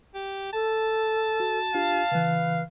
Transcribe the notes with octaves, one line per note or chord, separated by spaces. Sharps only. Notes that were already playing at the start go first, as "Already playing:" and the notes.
G4
A4 A5
F#4
D4 F4 G4 F5
C#3 E3 B4